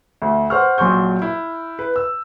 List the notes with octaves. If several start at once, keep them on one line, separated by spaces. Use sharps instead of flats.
D2
C5 F#5 C#6 F6
A#1 F#3 C6 C#6 G6
E4
B4
E6